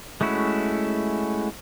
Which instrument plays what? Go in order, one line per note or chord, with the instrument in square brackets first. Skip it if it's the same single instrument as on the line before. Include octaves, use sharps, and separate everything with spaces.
[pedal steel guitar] G#3 A3 C#4 E4 F#4